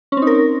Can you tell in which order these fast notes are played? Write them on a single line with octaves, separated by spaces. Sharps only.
C#4 C4 D#4 A#4